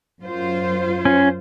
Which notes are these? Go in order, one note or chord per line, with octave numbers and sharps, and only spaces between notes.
F#2 F4 C5
C#4